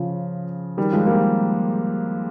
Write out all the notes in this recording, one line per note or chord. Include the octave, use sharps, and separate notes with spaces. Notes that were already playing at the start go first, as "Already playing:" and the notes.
Already playing: C#3 F3
D#3 G3
F3 G#3
G3 A#3